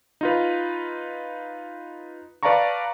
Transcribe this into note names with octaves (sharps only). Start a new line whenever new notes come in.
D#4 F4 B4
B4 D5 F5 A5 A#5 C#6